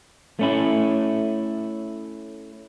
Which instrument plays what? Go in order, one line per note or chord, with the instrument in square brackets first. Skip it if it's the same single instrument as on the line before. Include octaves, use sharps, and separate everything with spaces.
[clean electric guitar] A3 C#4 E4